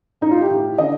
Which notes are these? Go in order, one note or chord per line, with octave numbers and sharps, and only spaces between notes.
A2 D#4
F4
G4
A2
D3 D#5